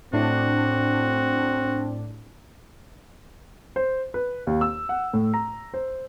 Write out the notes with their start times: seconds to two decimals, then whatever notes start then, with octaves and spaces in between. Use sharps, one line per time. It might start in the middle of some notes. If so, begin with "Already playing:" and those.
0.13 A2 C4 D4 F#4
3.76 C5
4.14 B4
4.47 D#2
4.61 E6
4.89 F#5
5.13 A2
5.34 A#5
5.74 C5